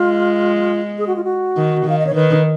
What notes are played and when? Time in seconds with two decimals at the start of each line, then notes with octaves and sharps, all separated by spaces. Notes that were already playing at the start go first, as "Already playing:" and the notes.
Already playing: G#3 F4
0.98 G#4
1.07 F#4
1.16 F4
1.24 F#4
1.57 D#3
1.86 D#3 F5
1.98 D#5
2.06 C#5
2.15 D#3 B4